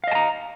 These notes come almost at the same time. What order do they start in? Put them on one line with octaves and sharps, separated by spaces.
F5 D#5 A5 A#5